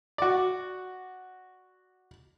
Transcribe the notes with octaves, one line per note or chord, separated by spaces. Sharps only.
F#4 D5